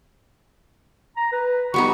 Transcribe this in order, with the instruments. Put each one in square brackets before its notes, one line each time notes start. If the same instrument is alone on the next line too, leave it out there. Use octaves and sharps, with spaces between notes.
[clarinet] A#5
B4
[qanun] G3 B3 D#4 [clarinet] C#6